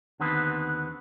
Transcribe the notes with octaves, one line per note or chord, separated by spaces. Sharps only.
D#2 D3 D#3 B3 C4 B4